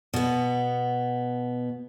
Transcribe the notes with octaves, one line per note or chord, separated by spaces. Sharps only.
B2 B3